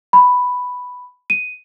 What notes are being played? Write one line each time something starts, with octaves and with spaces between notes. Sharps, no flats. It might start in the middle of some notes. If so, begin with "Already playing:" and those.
B5
D#7